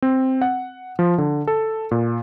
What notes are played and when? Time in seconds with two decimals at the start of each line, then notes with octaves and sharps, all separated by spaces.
0.02 C4
0.41 F#5
0.99 F3
1.18 D3
1.47 A4
1.91 A#2